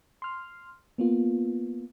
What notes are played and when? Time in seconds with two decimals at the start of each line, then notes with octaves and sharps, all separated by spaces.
0.22 C6 F6
0.98 A#3 B3 F4